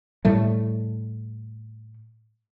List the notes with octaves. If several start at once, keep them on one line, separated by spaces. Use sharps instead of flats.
A2 G3 A3